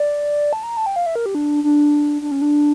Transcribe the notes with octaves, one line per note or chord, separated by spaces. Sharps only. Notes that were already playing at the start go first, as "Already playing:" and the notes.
Already playing: D5
A5
A#5
A5
G5
F5
E5
A#4
G4
D4
D4
D4
C#4
D4